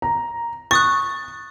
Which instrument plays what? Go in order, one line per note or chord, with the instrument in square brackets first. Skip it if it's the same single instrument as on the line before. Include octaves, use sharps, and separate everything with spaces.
[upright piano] A#5
[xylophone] C#6 D#6 F#6 [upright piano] A6